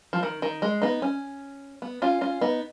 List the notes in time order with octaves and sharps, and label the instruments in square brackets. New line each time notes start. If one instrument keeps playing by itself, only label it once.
[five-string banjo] F3
D#3
D#3
G#3
B3 D#4
C#4
B3
C#4 F4
C#4 F4
B3 D#4